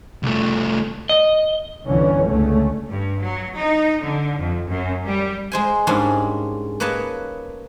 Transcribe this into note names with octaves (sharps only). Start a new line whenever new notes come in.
C2 A3
D#5
G1 C2 D3 E3 C#4
C#2 D3 A3 C#4
G2
F#3
D#4
D3
F2
F#2
G3
G#3 C5 G#5
G#2 G3 G#3 A#3 C#4 D4
A#3 B4 C#5 D#5 A5